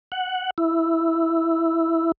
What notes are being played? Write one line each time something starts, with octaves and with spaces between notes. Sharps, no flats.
F#5
E4